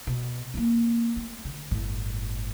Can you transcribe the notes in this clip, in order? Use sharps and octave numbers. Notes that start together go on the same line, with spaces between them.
B2
A#3 C4
A3
D3
G1 A2